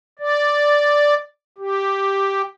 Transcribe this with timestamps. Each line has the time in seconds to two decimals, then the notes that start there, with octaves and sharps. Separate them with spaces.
0.19 D5
1.58 G4